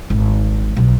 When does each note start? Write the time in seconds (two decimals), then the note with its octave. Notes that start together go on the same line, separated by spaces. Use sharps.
0.10 G#1
0.76 B1